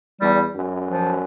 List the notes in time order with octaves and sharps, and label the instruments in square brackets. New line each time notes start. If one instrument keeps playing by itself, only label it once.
[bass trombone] E2 [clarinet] G3
[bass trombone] F#2
[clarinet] F3